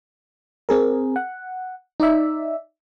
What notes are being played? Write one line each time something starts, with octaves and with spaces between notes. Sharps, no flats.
C4 G#4 A#4
F#5
D#4 D5 E5